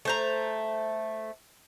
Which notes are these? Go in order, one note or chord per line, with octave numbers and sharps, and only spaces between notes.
A3 C5 A#5